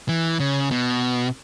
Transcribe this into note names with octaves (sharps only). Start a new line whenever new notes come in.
E3
C#3
B2